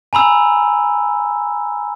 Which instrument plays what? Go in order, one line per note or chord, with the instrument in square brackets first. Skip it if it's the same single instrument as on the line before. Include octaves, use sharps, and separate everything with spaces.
[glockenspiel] G#5 A#5 B5 E6